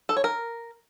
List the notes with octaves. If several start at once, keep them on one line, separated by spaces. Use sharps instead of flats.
A4
C#5
A#4